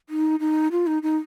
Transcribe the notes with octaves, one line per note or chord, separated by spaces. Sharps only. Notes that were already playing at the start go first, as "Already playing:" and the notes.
D#4
D#4
F4
D#4
D#4